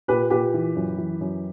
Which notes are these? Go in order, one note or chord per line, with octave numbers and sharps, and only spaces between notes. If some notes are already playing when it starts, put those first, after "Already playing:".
A#2 G4 B4
A#2 G4 B4
E3
F#2
E3
F#2